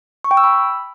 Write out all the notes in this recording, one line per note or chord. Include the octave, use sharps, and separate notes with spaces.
C#6
G5
E6
B5